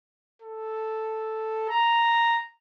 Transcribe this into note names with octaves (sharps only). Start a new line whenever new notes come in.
A4
A#5